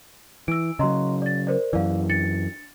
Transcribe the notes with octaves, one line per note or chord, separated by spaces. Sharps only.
E3 E6 D7
C#3 F#3 D#5 A#5 C6
D5 A6
A#4 C5 D5
F#2 E3 D5 F5
D4 A6 C#7